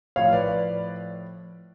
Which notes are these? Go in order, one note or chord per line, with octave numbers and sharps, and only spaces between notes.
A2 F3 C#5 F5
B4 D5